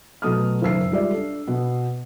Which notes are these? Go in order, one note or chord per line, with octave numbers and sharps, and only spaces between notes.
B2 F#3 A3 D#6 F6
F#1 D#3 E6 C7
G3 G#3 F4 G4 D5 E5
D4 A4
B2 B3